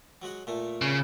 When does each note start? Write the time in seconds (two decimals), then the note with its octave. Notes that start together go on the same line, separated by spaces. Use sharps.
0.22 F#3 G#3 F#4
0.47 A#2 A3
0.82 C#3